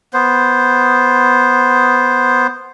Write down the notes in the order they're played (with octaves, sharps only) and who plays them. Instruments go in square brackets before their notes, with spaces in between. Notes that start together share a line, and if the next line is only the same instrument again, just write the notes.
[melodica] B3 C5